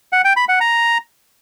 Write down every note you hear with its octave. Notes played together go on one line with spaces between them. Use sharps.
F#5
G5
B5
F#5
A#5